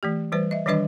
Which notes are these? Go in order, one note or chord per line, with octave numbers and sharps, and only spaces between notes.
E3 A3 G4
E3 G3 B4 C5
D#5 E5
D#3 E3 G3 D4 B4 D#5